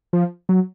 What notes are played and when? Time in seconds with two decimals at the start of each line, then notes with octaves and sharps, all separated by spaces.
0.13 F3
0.49 F#3